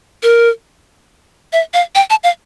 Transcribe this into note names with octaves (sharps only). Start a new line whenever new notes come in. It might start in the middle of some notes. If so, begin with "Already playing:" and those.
A#4
E5
F5
G5
A5
F5